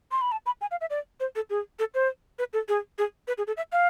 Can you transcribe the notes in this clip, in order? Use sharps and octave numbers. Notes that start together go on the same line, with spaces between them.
C6
B5
A5
B5
G#5
F5
E5
D5
C5
A4
G#4
A4
C5
B4
A4
G#4
G#4
B4
G#4
A4
E5
F5